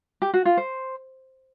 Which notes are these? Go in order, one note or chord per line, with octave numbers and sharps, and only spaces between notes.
G4
F#4
F4
C5